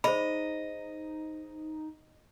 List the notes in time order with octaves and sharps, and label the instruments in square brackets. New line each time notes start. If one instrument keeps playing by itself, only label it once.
[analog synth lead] D#4 [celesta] G#4 C5 [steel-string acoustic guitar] D#5 [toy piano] B5